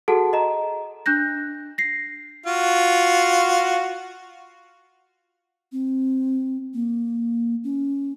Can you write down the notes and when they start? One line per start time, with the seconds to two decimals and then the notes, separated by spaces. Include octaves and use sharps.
0.08 F#4 G#4 A4 F#5 A5
0.33 D#5 A#5
1.06 D4 F#6 G6 A#6
1.78 A#6 C7
2.46 F4 F#4
5.72 C4
6.74 A#3
7.64 C#4